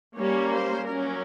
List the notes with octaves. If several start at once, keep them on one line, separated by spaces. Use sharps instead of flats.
G3 A#3 C#4 C#5
C5
F#3 A#3 C#4 A#4